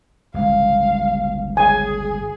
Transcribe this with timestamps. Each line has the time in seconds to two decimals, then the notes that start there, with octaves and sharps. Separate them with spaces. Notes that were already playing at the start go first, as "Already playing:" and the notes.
0.34 G1 C#2 F5
1.57 G#4 G#5